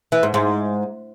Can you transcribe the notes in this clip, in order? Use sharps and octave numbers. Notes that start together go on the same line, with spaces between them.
E3
G#2
G#2